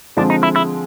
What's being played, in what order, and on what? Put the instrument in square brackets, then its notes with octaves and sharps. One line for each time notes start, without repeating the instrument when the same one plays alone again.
[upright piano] D3 F3 G#3 C4 [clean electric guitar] D4
[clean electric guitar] D#4
E4
E4